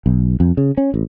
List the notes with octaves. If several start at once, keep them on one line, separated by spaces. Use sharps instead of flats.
B1
F2
C#3
C#4
A1